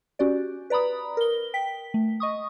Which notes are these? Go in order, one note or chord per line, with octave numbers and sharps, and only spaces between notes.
C#4 F#4 G4 D5
B4 D5 A#5 B5 D#6
A#4 G7
G5 B6
A3
D#5 C#6 D#6